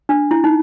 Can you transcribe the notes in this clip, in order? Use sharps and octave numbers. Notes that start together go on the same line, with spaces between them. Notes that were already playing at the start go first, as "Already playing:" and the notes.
D4
E4
D#4